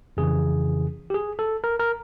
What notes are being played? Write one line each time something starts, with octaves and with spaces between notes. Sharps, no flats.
F2 C#3 E3 G#4
G4
G#4
A4
A#4
A#4